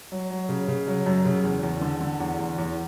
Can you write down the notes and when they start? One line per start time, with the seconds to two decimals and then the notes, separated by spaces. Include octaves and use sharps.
0.12 F#3
0.31 F#3
0.49 C#3
0.68 C#3
0.87 F#3
1.06 F#2
1.25 C#3
1.44 E2
1.63 E2
1.81 D3
2.01 D3
2.20 E2
2.39 E2
2.58 E2